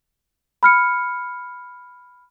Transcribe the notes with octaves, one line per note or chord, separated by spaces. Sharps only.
B5 F6 C#7